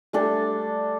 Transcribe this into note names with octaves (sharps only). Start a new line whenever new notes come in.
G3 A3 D4 A4